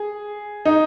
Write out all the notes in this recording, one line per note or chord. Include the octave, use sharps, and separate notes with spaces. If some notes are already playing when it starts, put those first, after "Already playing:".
Already playing: G#4
D#4